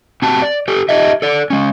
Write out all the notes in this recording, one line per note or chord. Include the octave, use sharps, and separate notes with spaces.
C4 F#4 G4 A5
D5
G4 A4
D#4 G4 D#5 E5
A4 D5
G#3 C#4